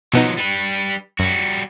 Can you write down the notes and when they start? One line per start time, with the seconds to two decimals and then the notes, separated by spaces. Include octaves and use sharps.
0.13 B2 F3 F#3 B3 D#4
0.38 G3 B4
1.19 F#2 G3 F#4